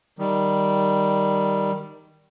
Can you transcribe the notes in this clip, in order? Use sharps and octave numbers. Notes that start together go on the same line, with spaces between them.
D#3 G3